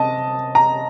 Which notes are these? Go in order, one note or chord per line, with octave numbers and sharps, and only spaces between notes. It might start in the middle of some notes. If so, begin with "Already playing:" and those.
Already playing: C3 D#5 A5
A#5